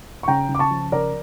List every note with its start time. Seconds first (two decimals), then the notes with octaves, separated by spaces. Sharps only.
0.23 C#6
0.28 C#3 G5 A#5
0.49 C#3
0.55 D6
0.59 A5 C#6
0.70 F3
0.92 C#3 A#4 D5